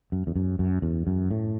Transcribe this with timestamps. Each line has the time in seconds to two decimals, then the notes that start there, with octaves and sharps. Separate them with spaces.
0.12 F#2
0.27 E2
0.36 F#2
0.59 F#2
0.82 E2
1.07 F#2
1.31 A2